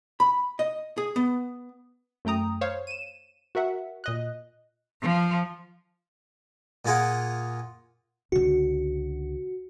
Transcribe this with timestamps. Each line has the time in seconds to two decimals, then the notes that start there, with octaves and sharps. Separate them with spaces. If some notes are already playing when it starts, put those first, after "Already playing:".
0.20 B5
0.59 D#5
0.98 G#4
1.16 B3
2.25 F#2 A3 G5 A#5 D#6
2.61 C5 C#5 F5
2.87 D#7 E7
3.55 F#4 A#4 E5 F#5
4.04 A#2 D#5 F#6
5.01 F3
6.85 A#2 A#3 F4 G#4 A#4 F#5
8.32 C#2 D3 F#4